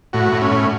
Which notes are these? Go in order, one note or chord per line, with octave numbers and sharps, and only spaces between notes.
A2 F#4
A2
C#4
A2